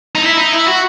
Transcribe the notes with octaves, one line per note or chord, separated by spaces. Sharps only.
D#4
E4
D#4
E4
F#4